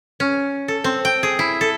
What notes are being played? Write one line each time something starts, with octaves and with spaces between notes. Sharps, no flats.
C#4
A4
C4
G5
G#4
E4
A4